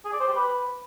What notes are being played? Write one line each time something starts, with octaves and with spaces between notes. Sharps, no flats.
G#4
D5
C5
G4
B4